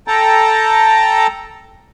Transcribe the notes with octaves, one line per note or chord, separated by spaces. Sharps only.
A4 G5 A5 A#5